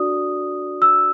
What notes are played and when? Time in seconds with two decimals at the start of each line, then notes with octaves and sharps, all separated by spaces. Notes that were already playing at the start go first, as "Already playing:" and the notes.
Already playing: D4 F#4 A4 D5 D#6
0.82 E6